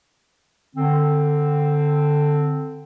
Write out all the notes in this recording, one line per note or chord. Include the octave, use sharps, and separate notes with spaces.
D3 C4